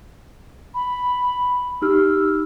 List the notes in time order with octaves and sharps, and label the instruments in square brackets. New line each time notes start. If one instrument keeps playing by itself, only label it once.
[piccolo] B5
[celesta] D#4 G4 F6 [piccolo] E6